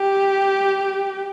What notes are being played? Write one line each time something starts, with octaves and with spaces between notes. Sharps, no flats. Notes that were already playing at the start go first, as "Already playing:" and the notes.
Already playing: G4